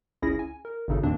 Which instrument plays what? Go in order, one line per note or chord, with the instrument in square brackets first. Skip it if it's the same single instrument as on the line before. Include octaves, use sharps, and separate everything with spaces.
[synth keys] G1 C#2 C#4 E4 G#4 A#6
G#5
A#4
G#1 G2 C#3 D#4 A4
D#2 G#2 D#3 A#3 C4 D4